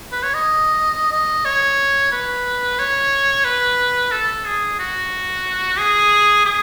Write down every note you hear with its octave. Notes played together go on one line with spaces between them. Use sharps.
B4
C#5
D#5
D#5
C#5
B4
C#5
B4
A4
G#4
F#4
G#4
G#4